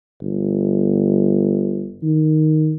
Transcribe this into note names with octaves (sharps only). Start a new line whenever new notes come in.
G1
D#3